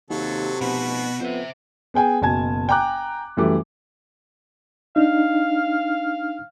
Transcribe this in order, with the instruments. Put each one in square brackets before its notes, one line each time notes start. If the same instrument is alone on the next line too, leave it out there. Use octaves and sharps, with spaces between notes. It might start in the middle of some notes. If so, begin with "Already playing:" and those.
[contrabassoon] D#2 [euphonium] C3 [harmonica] F#3 A4
[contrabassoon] F1 [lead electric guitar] B2 [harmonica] F#4 B4
[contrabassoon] F2 [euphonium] B3 [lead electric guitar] C5 E5
[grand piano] B3 G#4 G5 G#5
F#1 B2 G#5 A5 G#6
G5 G#5 A#5 D6 F#6
F#2 E3 G3 A3 D6
[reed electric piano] D4 D#4 [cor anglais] F5